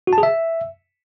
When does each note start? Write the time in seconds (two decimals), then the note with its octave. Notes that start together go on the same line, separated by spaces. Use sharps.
0.07 F#4
0.13 A5
0.18 G#4
0.23 E5